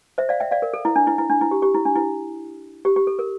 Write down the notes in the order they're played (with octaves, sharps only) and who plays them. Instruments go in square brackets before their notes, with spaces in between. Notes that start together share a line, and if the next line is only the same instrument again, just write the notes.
[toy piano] C5 E5
D5 F5
E5 G5
D5 F5
A#4
A4
E4
D4
E4
E4
D4
E4
G4
G4
E4
D4
E4
G4
G4
A4
A#4